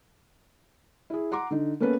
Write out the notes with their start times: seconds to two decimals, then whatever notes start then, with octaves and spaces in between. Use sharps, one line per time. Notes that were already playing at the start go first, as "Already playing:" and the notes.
1.10 E4 G#4
1.32 F#5 A#5 C6 D6
1.51 D3 D#4
1.80 A#3 B3 C#4 A4 B4